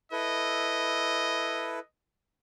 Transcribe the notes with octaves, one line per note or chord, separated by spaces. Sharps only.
E4 A4 B4 D#5